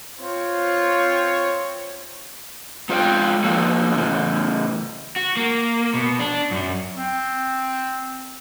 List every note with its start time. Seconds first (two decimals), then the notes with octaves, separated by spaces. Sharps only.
0.20 C4 F4 C#5
2.89 G#3 F4 F#4 C#5 F5 G5
3.44 F3 A#3 F#4 A4
3.94 A2 C#3 E3
5.16 F#4
5.37 A#3
5.94 B2
6.19 D4
6.51 F#2
6.96 C4